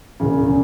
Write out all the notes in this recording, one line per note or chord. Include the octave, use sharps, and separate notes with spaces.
E1 E2 C#3